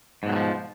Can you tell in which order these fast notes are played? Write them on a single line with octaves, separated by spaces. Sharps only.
G#2 B2 F#3 D#3 F3